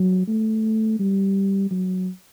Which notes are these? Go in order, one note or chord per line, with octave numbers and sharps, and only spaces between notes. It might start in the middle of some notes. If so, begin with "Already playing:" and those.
Already playing: F#3
A3
G3
F#3